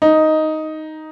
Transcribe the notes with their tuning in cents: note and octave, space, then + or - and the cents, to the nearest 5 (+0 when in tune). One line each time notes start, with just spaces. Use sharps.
D#4 +5